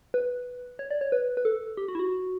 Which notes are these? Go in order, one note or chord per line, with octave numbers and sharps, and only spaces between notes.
B4
C#5
D5
C#5
B4
B4
A4
G4
F#4
E4
F#4